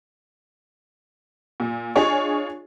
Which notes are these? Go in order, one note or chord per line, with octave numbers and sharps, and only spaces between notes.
A#2
D4 F4 G#4 C#5 D#5 C#6